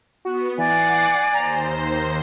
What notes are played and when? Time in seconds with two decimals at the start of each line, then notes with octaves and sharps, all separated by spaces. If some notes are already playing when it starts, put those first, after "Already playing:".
0.25 B3 F#4
0.58 E3 D5 F#5 G#5 D6 C7
1.34 D#2 C5 A#5